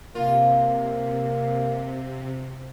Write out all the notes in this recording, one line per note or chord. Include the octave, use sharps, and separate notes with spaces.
C3 A#3 F4